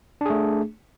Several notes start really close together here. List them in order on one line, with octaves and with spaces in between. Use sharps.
D4 G#4 A3